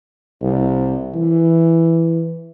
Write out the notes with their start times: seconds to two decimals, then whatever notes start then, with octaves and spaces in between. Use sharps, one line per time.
0.42 C2
1.14 E3